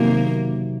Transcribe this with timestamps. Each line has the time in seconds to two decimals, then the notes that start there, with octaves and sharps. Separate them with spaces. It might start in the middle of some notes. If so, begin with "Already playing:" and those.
Already playing: C3 D#3 F#3 A#3